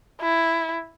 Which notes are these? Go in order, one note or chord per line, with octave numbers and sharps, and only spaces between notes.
E4